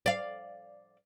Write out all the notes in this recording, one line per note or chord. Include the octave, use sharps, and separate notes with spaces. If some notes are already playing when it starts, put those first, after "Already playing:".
D5 F5